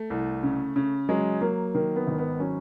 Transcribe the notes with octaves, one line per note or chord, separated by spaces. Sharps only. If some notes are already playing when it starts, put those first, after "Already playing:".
Already playing: A3
C2
C#3
C#3
F#3 G#3
F#3 A#3
D#3 A#3
B3
G#1
B3
F#3 C#4